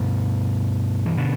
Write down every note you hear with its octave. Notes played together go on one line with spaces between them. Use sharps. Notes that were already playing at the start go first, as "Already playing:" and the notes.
Already playing: G2 B2
E3
B2 D3